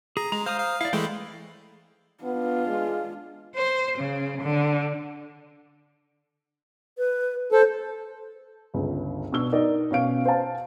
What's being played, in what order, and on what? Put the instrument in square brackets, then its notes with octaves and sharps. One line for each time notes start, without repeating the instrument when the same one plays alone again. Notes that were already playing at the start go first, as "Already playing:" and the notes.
[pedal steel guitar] G#4 [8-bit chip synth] A#5
[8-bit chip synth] G#3 [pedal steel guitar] A#5
[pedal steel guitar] C5 A#5 D#6 [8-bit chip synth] F5
[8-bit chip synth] F5
[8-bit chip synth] E4 [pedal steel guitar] D5 F5
[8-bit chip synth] E3 G#3 A3 [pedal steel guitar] G5 B5
[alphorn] B3 [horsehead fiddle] D4 F4
[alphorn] G#3
[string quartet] C5
C#3
D3
[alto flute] B4
[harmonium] A4 [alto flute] C5
[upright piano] G1 C#2
B2 B3 D4 E6 G7
D#4 A#4 D5
B2 C#4 F5 D7
C5 F5 A5